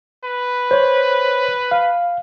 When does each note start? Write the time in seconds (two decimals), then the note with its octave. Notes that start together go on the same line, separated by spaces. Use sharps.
0.25 B4
0.71 C5 C#5
1.71 F5